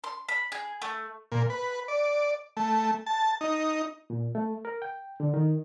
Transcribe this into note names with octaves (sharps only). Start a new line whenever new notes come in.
C6
B5
G#4
A3
A#2
B4
D5
A3
A5
D#4
A#2
A3
A#4
G5
D3
D#3